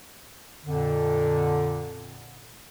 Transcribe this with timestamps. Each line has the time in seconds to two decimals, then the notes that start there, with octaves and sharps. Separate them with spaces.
0.65 F2 A#2 D3